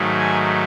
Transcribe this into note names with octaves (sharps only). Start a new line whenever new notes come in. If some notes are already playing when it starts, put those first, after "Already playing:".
Already playing: G#2 D#3 F#3 A3
G#5